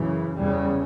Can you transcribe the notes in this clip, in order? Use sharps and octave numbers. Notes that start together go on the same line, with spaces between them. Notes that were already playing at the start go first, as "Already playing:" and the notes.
Already playing: F#2 C#3 E3
E2 C#3 G3